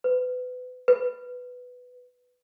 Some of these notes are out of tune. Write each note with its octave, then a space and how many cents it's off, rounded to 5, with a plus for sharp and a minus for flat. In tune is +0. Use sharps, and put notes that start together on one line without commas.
B4 +25
B4 +5